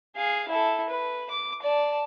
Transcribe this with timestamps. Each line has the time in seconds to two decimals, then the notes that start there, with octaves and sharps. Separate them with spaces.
0.16 G#4 F5
0.48 E4 A4
0.89 B4
1.30 D6
1.62 D5 A5